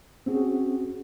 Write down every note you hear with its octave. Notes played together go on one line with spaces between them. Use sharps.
C4 C#4 F#4 G#4